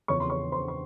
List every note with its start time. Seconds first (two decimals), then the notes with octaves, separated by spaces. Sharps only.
0.08 E2 C#3 F3 C#5 C#6
0.20 C6
0.30 C#5 C#6
0.52 C5 C6
0.68 C#6